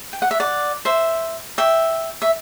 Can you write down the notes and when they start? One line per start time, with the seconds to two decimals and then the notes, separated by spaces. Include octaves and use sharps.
0.13 G5
0.22 F#5
0.31 E5
0.40 D5 F#5
0.85 C5 E5
1.58 E5 G5
2.22 E5